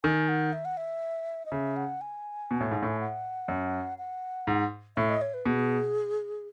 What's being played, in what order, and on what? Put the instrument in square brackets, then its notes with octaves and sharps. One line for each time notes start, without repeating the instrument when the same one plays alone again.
[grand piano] D#3 [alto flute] G#5
[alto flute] F#5
E5
F#5
E5
D#5
[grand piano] C#3 [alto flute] E5
[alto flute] F#5
G#5
[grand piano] B2
A2
G#2
A2
[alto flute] F#5
[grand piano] F#2
[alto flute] F#5
[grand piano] G#2
[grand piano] A2 [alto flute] E5
[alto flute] D#5
C#5
B4
[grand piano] B2 [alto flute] G#4